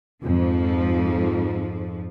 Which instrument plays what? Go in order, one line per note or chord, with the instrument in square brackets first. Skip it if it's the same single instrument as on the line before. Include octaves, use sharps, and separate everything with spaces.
[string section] F2 G#2 F3